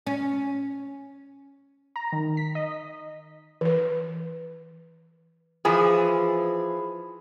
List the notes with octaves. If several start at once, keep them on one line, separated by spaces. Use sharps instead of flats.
C#4
A#5
D#3
B6
D#5
E3 B4
E3 F3 G#4